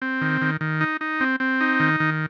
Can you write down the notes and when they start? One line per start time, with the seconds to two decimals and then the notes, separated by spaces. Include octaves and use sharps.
0.02 C4
0.21 D#3
0.41 D#3
0.61 D#3
0.81 D#4
1.01 D#4
1.20 C4
1.40 C4
1.61 D#4
1.80 D#3
2.00 D#3